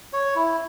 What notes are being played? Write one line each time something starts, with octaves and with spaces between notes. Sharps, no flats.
C#5
E4